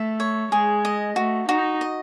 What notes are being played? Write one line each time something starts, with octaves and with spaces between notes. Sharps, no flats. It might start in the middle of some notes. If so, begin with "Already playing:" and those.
Already playing: A3 E5
C#5
G#3 G#4
D#5
A3 F#4
D#4 F#4
D#5